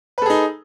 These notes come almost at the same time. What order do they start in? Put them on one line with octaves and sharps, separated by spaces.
B4 A4 G#4 D#4